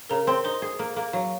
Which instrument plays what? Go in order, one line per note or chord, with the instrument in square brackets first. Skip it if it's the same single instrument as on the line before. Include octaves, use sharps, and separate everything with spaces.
[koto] C#3 [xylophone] A#4 A#5
[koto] C4 [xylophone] C5 C6
[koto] D#4 [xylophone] C5 C6
[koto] G#4
A#3
A#3
[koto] F#3 [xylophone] F5